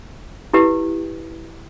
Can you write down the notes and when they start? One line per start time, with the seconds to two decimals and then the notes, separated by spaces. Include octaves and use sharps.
0.54 E4 G4 B4